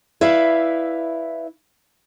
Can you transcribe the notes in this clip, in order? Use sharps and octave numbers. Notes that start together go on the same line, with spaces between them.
E4 B4 D5 E5 F5